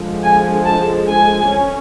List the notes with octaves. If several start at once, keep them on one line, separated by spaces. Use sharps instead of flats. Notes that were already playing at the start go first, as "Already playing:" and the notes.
Already playing: D3 F3 G#3
G#5
A5
G#5
C#4